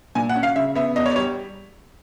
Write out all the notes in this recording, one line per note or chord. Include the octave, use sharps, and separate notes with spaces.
A#2 G#5
F#5
C#4
F5
C#3 E5
B3 E5
E2 D#5
C#5
D5
G3 C#5